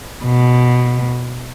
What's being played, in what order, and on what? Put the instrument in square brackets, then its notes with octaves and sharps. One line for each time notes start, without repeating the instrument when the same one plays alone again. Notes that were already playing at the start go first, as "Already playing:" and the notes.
[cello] B2